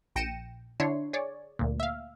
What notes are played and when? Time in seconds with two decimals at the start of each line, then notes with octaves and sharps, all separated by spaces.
0.16 A#1 G5 A#6 C#7 D#7 E7
0.80 D3 D4 E4 C#5 C6
1.13 G#4 C#5 D5
1.59 D2 A#2
1.80 E5 F5